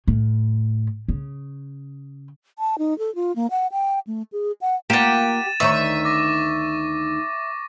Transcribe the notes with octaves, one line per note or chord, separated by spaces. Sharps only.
A2
C#3
A5
D#4
A4
F4
A#3
F#5
G5
A3
G#4
F#5
A#3 F4 G4 F#5 A6 D#7 E7
D2 D#3 C#5 E5 C#6
D6 A#6